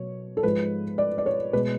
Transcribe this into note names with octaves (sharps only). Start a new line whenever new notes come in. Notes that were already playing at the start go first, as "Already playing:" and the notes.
Already playing: B2 F#3 C#5
A4
G#2 F3 G#3 B4
D5
D5
C#5
B2 G#3 B4